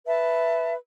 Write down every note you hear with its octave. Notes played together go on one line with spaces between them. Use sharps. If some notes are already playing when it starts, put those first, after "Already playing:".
B4 E5 A5